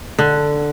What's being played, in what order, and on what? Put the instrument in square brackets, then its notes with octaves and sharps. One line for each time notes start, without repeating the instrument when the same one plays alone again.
[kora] D3